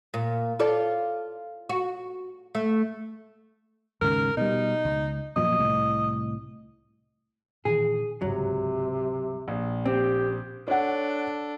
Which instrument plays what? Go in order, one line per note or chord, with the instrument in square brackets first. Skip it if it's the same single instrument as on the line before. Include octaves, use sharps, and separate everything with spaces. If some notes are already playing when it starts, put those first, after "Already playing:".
[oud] A#2
F4 A4 D5
F#4
A3
[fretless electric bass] D#2 G#2 C#3 [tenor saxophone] A#4
[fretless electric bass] B2 G3 [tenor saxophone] D#4
[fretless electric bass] C#2
[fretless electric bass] F#2 A#2 F3 [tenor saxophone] D#5
[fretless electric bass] C2 A2
[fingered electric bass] A#2 D#3 E3 [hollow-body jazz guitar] G#4
[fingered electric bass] G1 C#2 G#2 [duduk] C3 [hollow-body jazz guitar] F#3
[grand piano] A#1
[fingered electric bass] A#3 [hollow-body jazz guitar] C4 [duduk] G4
[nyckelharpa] D4 A4 [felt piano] C#5 F#5